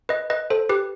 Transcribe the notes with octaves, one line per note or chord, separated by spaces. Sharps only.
B4 D#5
B4 D#5
A4 C5
G4 B4